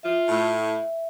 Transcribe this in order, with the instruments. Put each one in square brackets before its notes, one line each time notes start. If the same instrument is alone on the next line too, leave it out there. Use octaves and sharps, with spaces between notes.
[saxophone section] F4 [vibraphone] E5
[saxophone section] A2